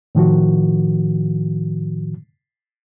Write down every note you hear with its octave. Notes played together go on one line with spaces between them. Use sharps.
A2 D#3 F3 F#4